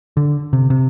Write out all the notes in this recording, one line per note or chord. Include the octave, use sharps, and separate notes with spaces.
D3
C3
C3